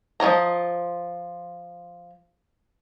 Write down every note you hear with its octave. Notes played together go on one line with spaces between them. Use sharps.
F3 C#4 D#5 A#5